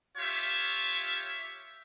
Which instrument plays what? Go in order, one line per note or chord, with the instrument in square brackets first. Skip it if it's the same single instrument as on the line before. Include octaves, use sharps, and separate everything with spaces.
[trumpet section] F4 G4 C#5 E5